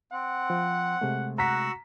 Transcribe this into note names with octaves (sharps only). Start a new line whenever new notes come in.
C4 F#5
F3
C3 G#3 A3
F#4 F#5 A#5 E6 B6